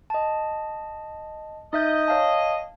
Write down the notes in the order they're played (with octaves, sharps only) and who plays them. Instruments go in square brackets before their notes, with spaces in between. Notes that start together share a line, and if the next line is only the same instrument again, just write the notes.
[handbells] D#5 A5
[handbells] D#4 E5 G6 [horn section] D#5
[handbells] C#5 F5 A5